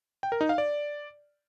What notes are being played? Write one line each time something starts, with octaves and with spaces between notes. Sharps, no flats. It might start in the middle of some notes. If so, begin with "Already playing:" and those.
G5
A#4
D#4
F5
D5